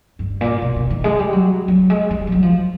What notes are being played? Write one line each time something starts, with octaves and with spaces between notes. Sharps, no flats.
G2
A#2
B2
B2
D#3
G#3
G3
F#3
F#3
G#3
G3
G3
F#3
F3